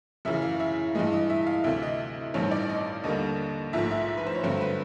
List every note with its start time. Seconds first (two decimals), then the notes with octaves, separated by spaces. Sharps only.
0.25 F#2 C#3 E3 E5
0.42 F5
0.60 E5
0.95 G2 E3 G#3 D#5
1.13 D#5
1.30 E5
1.47 F5
1.64 D2 C3 E3 E5
1.83 D#5
2.34 A1 G2 D#3 G3 C4 C#5
2.51 D5
2.69 D#5
3.04 D#2 D3 G3 A#3 D#5
3.73 A#1 G#2 F3 A3 E5
3.91 E5
4.08 E5
4.17 B4
4.27 C5
4.35 C#5
4.43 G2 D3 F#3 A3 C4 C5
4.61 B4